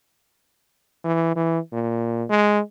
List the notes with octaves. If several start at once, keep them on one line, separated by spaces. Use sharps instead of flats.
E3
E3
A#2
G#3